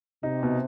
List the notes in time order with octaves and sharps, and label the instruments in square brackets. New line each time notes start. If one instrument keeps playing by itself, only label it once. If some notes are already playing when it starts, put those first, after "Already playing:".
[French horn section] C3 [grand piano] D#4
[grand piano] B2